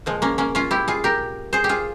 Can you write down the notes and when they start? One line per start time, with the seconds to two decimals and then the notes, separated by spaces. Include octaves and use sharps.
0.06 A#2 F3 G#3
0.22 A#3 C#4
0.38 A#3 C#4
0.55 C#4 F4
0.71 E4 G4
0.88 F4 G#4
1.04 G4 A#4
1.53 G#4 C5
1.64 G4
1.69 F4 G#4